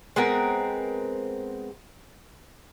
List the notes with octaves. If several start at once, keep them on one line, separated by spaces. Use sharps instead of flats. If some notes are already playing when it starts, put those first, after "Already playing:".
G#3 B3 C4 A#4